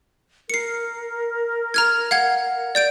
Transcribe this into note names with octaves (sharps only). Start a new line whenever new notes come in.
A#4 C7 C#7
A#5 F6 G#6
F5 F#5 G#6
D5 G6 D7